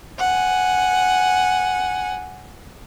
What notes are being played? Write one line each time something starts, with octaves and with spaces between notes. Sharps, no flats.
F#5 G#5